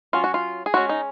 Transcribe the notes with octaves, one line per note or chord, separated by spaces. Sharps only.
F#3 C#4 F4
F#4
F4
G#4
G#3 C#4 F#4
D#4